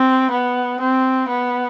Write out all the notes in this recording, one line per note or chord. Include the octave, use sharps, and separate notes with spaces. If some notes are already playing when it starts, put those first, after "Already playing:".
Already playing: C4
B3
C4
B3